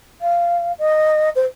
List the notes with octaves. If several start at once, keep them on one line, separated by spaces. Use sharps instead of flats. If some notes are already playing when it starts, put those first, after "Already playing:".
F5
D#5
C5